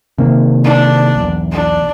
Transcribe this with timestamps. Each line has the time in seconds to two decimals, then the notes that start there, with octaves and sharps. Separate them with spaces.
0.18 C3 D#3 A#3
0.64 D4
1.16 B1 E2
1.51 D4